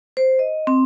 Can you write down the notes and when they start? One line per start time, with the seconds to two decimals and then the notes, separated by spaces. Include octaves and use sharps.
0.17 C5
0.39 D#5
0.67 C4